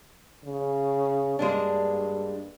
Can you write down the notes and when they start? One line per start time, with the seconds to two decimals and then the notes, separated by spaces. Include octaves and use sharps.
0.45 C#3
1.39 G2 G#3 A#3 D4